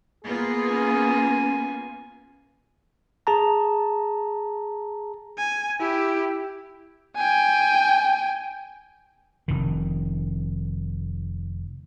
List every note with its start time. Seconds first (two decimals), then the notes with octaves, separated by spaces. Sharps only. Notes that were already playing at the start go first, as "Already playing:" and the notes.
0.24 A#3 B3 F4 G#4
0.68 C#4 G#5
3.27 G#4 A5 A#5
5.38 G#5
5.80 E4 G4
7.16 G5 G#5
9.48 F1 D#3